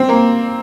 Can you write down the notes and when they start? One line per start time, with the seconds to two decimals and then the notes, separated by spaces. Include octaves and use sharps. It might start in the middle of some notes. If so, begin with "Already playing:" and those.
Already playing: C4
0.09 A#3